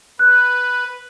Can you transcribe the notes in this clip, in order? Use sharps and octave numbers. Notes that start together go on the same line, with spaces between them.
B4 F#6